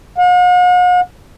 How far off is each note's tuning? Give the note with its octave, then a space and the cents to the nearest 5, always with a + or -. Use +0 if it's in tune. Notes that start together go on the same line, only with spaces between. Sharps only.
F#5 -45